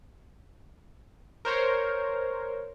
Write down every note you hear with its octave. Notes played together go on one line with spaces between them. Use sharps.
A#4 C5 C#5